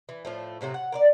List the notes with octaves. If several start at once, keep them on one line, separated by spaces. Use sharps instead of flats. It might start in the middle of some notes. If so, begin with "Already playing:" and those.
E3
A2 F3 A3
A2 C3 F#3 A3
F#5
A#4 B4 D5